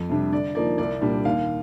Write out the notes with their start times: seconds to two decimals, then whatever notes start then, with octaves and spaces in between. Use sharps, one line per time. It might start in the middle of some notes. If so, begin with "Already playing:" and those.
Already playing: F2
0.09 C3 G3 D4
0.32 D3 D5
0.55 F3 A#3 D#4 D5
0.78 C2 D5
1.01 A#2 G3 D4
1.25 D#2 F5